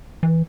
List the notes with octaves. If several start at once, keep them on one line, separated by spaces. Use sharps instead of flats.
E3